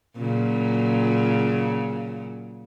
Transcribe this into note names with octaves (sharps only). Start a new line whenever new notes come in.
A#2 C#3 F#3